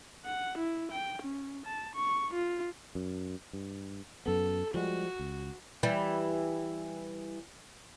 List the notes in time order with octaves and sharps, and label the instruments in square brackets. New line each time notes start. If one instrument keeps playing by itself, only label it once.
[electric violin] F#5
E4
G5
C#4
A5
C#6
F4
[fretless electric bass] F#2
G2
[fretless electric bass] F#2 B3 [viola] A4
[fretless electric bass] F3 G3 G#3 [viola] F#4
[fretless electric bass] C#2
[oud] E3 G3